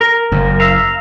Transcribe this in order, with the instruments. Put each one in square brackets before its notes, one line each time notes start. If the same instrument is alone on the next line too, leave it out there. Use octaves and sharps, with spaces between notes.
[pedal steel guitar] A#4
[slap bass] F#1 F#2
[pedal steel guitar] E5 F5 A#5